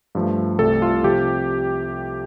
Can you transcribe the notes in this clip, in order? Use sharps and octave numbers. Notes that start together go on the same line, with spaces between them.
G2 F3 A3
C2 C3 A3 A4
F4
C3 F3 G4